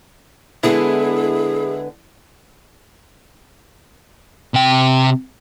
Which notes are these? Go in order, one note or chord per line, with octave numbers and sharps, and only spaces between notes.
D3 G#3 B3 E4 G#4
C3 G5